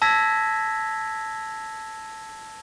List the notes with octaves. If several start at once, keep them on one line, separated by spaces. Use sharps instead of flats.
A5 E6 G#6 A#6 B6